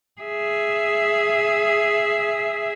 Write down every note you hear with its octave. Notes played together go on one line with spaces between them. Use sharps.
G#4 E5